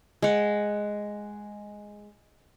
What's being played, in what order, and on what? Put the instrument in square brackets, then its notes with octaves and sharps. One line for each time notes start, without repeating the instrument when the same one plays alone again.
[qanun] G#3 F#5